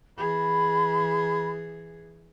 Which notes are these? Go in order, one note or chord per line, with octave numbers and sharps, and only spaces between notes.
E3 G#4 B5